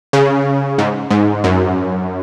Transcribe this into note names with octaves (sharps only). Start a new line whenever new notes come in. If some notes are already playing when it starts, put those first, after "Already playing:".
C#3
G#2
G#2
F#2